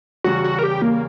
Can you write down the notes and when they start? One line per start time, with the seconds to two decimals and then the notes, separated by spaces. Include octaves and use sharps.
0.24 E2 C#3 G3 F#4
0.44 F#4
0.59 A#4
0.63 G4
0.82 A#3